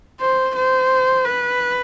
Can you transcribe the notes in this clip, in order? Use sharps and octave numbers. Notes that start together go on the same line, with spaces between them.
C5
C5
B4